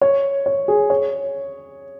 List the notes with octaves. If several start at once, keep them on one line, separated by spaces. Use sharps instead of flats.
C#5
C#5
G#4
C#5